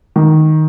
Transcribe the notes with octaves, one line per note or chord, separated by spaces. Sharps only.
D#3